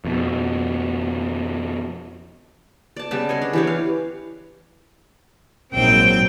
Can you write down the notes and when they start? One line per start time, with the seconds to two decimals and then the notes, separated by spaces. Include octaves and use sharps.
0.05 F2 B2
2.97 D5 A5
3.11 C#3 G3 B3 A5
3.29 G#4 C#5 D#5
3.42 D4
3.53 E3 G4 C#5
3.67 F5
5.72 A#1 G#2 F#3 C4 G5